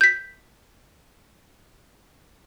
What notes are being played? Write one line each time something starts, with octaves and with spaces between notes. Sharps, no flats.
G6 B6